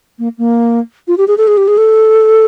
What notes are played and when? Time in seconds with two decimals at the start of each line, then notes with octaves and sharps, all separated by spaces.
0.19 A#3
0.38 A#3
1.08 F4
1.18 G4
1.28 G#4
1.38 A4
1.47 G#4
1.57 G4
1.68 G#4
1.78 A4